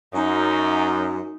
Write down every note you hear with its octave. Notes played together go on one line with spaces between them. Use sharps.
F#2 D#4